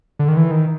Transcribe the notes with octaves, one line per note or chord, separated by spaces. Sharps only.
D3
D#3
E3
D#3